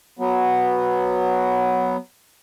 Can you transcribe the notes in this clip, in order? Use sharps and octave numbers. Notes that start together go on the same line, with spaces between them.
F#3 B3